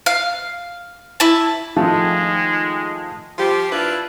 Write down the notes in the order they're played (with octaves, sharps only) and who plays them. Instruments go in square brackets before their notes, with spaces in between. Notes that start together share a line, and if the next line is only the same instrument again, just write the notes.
[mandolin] F5
E4 A5
[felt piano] D#3 F3 A3 [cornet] G#3
[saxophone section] F3 G4
D4 E4 F4 B4